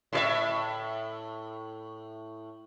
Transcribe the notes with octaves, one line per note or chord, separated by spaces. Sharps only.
A2 G#4 E5